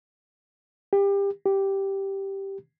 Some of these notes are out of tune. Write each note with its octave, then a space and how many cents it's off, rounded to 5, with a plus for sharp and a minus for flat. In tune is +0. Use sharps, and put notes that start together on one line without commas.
G4 +25
G4 -5